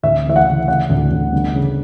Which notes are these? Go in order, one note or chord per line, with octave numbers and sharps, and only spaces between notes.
D2 E5
E3 E5
F#5
C#3
C#3 F#5
D2
D2
G1
C#3